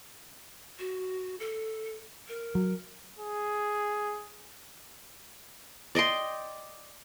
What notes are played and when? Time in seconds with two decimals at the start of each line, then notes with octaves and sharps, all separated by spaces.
0.79 F#4
1.40 A4
2.28 A#4
2.55 F#3
3.19 G#4
5.95 D5 D#5 G5 C6